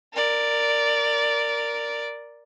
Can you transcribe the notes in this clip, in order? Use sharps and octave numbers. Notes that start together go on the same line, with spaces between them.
A#4 D5